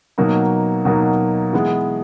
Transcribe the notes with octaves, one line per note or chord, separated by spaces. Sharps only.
B2 F#3 A#3 D#4
B2 F#3 A#3 D#4
E3 G#3 B3